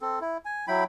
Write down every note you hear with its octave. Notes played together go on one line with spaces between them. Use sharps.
C4 A4
E4
G#5
F#3 E4 G5 B5